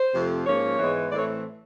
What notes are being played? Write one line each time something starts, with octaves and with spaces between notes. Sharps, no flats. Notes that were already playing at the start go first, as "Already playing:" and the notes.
Already playing: C5
F2 C3 F3 A3
G#2 F3 A#3 C#4 C#5
G#2 E3 G#3 B3
A2 E3 A3 C4 D5
C#5